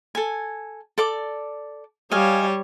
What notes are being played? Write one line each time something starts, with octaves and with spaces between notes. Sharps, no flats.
A4 G#5
A4 D5 D6
G3 C#5 D#5 F5 G#5